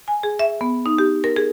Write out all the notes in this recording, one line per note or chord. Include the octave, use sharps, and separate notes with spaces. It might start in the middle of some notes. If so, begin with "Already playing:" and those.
G#5
G#4
E5
B3
D#4
G4
A#4
G#4